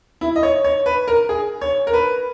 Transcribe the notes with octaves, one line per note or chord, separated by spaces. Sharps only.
E4
D#5
C#5
C#5
B4
A#4
G#4
C#5
A#4
B4